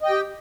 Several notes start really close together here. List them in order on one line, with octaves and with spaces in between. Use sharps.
D#5 G5 G4